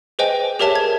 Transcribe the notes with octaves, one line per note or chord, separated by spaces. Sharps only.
G#4 B4 C5 D#5 G5 G#5
G4 G#4 A#4 C#5 E5 A5
G#6